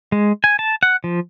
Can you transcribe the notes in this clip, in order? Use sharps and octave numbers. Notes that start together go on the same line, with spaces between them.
G#3
G#5
A5
F#5
F3